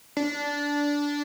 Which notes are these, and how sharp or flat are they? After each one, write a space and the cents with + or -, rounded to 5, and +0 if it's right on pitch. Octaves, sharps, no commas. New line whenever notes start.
D4 -15